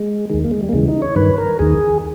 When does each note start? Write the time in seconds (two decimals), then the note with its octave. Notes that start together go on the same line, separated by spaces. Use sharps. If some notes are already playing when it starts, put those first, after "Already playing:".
Already playing: G#3
0.30 D#2 D#3 G#3
0.44 A#3
0.51 G#3
0.63 G3
0.69 A#3
0.73 D#2 C#3 E3 G#3
0.88 D#4
1.02 C#5
1.16 G2 D#3 B4
1.38 A#4
1.59 D#2 D#3 G#4